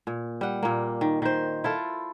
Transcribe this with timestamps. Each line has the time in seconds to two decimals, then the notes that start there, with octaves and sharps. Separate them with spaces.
0.07 A#2
0.41 G3 F#5
0.63 A#2 A#3
1.01 D#3
1.22 D#3 C5
1.64 E4 F4 A4